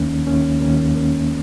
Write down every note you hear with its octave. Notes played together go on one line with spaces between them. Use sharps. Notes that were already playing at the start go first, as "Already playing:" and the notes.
Already playing: D#2 D#3 A#3 C#4
D#2 D#3 A#3 C#4
D#2 D#3 A#3 C#4
D#2 D#3 A#3 C#4